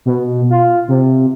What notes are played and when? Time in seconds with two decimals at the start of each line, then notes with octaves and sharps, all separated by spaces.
0.06 B2
0.50 F4
0.88 C3